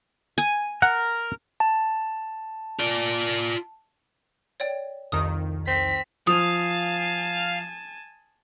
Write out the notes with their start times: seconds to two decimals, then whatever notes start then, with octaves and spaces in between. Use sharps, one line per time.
0.38 G#5
0.82 A#4 F#5
1.60 A5
2.79 F4 D5
4.60 C#5 D5 G5
5.12 C2 F2 D#3 D#6 F6
5.67 C4 B6
6.27 F3 F5 G#5 A5 D#6